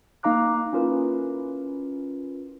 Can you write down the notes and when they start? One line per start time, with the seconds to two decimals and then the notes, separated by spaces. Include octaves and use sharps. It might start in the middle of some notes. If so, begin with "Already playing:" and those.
0.23 A#3 D#4 F5 A#5 D6 F#6
0.73 C#4 E4 F4 A#4 B4